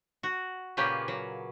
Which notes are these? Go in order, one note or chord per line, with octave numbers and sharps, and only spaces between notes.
F#4
A#2 C#3 A#3 C#4 G4 B4
F#3